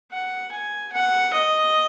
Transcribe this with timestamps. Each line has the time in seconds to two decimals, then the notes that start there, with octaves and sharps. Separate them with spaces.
0.12 F#5
0.52 G#5
0.93 F#5
1.34 D#5